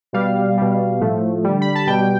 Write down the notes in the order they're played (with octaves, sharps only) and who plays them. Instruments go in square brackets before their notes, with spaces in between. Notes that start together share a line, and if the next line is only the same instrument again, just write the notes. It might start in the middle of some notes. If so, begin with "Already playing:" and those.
[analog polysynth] B2 G3 F5
B2 G3
A2 F3 A3
D3 G3
B5
A5
B2 G3 G5